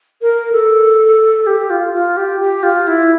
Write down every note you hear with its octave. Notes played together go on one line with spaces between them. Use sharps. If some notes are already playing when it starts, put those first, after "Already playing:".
A#4
A4
G4
F4
F4
G4
G4
F4
E4